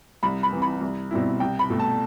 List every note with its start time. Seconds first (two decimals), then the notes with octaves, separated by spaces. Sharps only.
0.23 C2 B5
0.43 B5
0.52 C3 E3
0.62 B5
0.81 C2
1.11 B2 G3 C4 E4
1.40 C2 G5
1.59 B5
1.70 B2 A3
1.80 A5